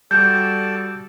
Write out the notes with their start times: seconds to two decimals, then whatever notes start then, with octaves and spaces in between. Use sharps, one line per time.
0.11 G3 F#4 A4 D5 A5 G6